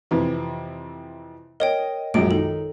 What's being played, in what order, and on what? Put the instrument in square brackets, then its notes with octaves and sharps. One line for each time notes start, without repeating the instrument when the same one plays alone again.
[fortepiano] F2 C3 E3
[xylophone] A#4 C#5 G5 [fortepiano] D#5
[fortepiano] A#1 F#2 G#3 [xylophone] D7
[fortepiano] D#3 D#4 [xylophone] A4